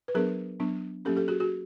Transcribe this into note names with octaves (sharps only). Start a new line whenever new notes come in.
B4
F#3 B3 D4 G#4 A#4
F#3 B3 D4
F#3 A#3 C#4 G4 A4
G4 A4
F#4 G#4
F#4 G#4